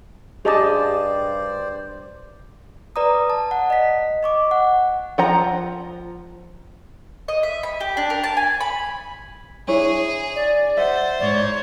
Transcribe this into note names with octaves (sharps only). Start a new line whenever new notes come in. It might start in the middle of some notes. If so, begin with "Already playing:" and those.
G2 G4 G#4 C5 D5 D#5 A5 D6
B4 D5 A#5 D#6
A5
F#5
D#5 B6
D#5 C#6 D6
F#5
F3 F#5 A#5
D#5
E5
B5
G4
D4
A#4
A5
G#5
B5
D4 E4 G#4 C#5
D5
C5 E5 F#5
G#2 C#5 D5